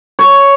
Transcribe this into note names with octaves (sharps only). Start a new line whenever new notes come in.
C#5